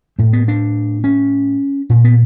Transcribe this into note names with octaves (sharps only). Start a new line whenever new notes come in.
A2 A3
B3
D4
C#4
A#2
B3